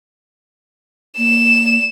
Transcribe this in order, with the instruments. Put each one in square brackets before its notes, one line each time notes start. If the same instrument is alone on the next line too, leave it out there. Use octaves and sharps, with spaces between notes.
[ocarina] A#3 [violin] E7